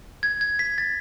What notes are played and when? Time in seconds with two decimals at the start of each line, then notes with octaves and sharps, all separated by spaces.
0.23 G#6
0.41 G#6
0.59 B6
0.78 A6